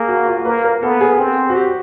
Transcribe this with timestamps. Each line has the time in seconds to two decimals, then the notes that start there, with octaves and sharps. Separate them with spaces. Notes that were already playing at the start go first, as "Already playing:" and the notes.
Already playing: A#3 G#4
0.08 F#4
0.28 F4
0.45 A#3 B4
0.64 A#4
0.83 B3 A4
1.01 G#4
1.19 C4
1.50 F#4
1.55 G4